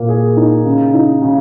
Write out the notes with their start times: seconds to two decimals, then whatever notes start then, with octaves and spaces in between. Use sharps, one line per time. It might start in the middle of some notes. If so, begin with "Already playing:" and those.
Already playing: A#2 A#3
0.08 G#4
0.37 D#4
0.65 C#3
0.94 D#4
1.22 C#3